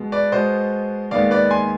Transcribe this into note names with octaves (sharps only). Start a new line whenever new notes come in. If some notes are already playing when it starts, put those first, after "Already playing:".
Already playing: B2 G#3 B3
B4 D5
B2 G#3 B3 C5 D#5
D#2 D#3 G#3 B3 D5 F5
B4 D5
G#5 C6